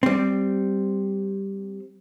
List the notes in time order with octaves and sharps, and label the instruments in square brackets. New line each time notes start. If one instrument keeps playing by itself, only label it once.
[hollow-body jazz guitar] G3 C4